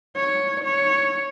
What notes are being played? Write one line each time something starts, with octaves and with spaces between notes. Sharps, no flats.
C#5
C#5